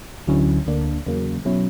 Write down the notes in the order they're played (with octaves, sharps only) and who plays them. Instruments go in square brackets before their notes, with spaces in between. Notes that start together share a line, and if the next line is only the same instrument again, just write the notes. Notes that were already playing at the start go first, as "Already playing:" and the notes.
[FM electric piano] D2 D3 F#3 C#4 E4
D2 D3 A#3 D4
E2 C#3 F#3 A#3
B2 F#3 C#4 E4